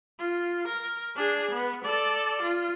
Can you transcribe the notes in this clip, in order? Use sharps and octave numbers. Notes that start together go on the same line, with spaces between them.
F4
A#4
D4 G#4
B3
A4 D5
F4